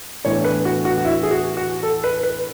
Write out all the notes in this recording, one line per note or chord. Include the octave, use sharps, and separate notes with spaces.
A2 E3 B3 D4 C#5
B4
F#4
F#4
F#4
E4
G#4
F#4
F#4
A4
B4
B4